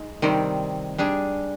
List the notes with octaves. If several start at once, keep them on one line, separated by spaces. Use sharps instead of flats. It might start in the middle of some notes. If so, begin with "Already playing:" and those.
Already playing: G#3 D#4
C3 D#3 G3 C4
G3 D4 G#4